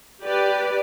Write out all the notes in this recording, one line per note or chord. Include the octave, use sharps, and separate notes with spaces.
G4 B4 D5